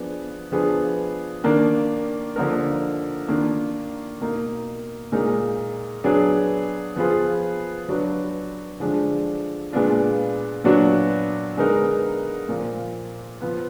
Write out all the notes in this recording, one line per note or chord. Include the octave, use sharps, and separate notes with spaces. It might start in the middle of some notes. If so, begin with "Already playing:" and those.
Already playing: F3 B3 D4 G#4
F3 B3 D4 G#4
D#3 A#3 D4
D3 F3 A#3 D#4 A#4
D#3 A#3 D4 F4
B2 A#3 D#4
A#2 G#3 D#4 A#4
F#3 B3 D4 G#4
F3 B3 F4 G#4 B4
F#3 D4 F#4 B4
D3 F3 G#3 D4
A#2 G#3 B3 D4 F4
A#2 F#3 B3 D4 F#4
D3 G#3 B3 D#4 A#4
A#2 F3 A#3 F4
F3 B3 F4